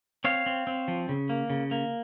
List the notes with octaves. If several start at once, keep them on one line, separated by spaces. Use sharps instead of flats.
C4 C#5 F5
C4
C4
F3
C#3
A#3
C#3
A#3